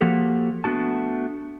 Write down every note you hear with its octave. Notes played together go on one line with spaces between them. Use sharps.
F3 A#3 F#4 G4 A4
A3 B3 D4 F#4 A5